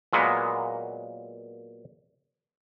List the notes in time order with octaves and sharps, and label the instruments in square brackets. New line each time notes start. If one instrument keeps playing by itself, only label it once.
[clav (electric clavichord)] A#2 F#3 G#3 A#3 B3